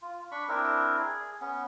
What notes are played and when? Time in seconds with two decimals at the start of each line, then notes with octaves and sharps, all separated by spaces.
0.02 F4
0.31 D4 B5 C#6
0.49 C4 D4 E4 A#4
0.99 G#4
1.41 B3 C#4